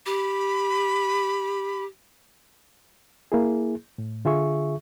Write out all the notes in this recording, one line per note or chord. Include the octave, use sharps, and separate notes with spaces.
G4 B5
A#3 E4 G#4
A2
D3 F4 G#4 E5 C#6